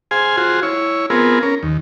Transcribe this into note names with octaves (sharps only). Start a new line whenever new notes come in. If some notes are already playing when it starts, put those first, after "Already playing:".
G#4 C5 F5 G#5
F4 F#4 G#4 C5
E4 C#5
B3 C4 F4 G#4 A#4
C#4 A#4
D#2